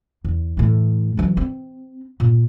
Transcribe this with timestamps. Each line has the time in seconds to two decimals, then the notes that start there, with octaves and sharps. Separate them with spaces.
0.24 E2
0.57 A2 E3
1.17 E3 F#3
1.37 C4
2.20 A#2